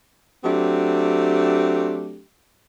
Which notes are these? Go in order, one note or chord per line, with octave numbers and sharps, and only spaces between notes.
F#3 A3 C4 D4 G4